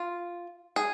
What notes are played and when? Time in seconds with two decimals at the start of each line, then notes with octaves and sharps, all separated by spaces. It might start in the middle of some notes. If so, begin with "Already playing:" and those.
Already playing: F4
0.76 G#4